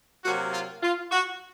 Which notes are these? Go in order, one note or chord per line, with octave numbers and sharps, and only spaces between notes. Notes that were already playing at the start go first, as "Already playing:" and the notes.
C3 F#3 A#3 F#4
F4
F4
F#4